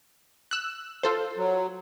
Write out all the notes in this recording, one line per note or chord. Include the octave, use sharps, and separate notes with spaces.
E6 F#6
F4 A4 C5
F#3